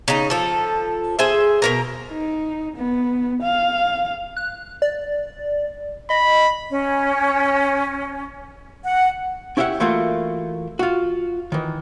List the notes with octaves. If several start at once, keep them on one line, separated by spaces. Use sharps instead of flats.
C#3 D#4
F3 A4
G#4 C5 E5
B2 A#4 A#5
D#4
B3
F5
F#6
D5
D#5 B5
C#4
F#5
C#4 E4 G4 C#5 E5 F#5
E3 A3 A#3 F4 F#4
F4 F#4
D#3 E3